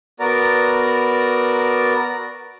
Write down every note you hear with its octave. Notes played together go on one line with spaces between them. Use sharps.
B3 F#4 A#4 D5 A#5